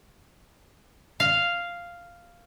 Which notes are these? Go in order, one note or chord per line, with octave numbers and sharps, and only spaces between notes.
F5